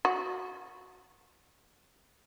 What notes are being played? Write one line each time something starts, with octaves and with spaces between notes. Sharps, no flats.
F#4